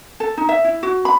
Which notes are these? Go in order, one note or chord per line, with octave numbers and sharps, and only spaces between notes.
A4
D#4
E5
E4
F#4
B5